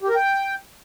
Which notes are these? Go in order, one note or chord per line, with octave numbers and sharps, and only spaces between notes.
G4
A#4
G5